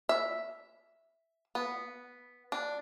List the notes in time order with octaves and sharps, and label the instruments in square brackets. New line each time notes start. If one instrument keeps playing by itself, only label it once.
[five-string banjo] E5
B3
D4